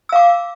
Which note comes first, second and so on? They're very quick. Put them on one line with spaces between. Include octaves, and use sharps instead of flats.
E6 F5 D6